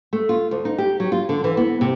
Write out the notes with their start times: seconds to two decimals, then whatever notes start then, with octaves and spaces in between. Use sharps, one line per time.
0.13 A3
0.29 F4
0.51 D2
0.65 D#4
0.78 G4
1.00 F#3
1.12 F4
1.29 D3
1.44 E3
1.57 B3
1.81 C3